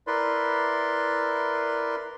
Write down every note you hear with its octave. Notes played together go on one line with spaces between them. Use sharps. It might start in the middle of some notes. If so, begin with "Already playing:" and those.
E4 A#4 B4 D5 C6